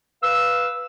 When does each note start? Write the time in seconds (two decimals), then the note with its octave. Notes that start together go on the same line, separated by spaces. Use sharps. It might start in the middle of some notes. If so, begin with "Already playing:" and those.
0.23 B4 F5 E6